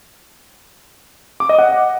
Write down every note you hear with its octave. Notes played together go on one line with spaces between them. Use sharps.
D6
D#5
F#5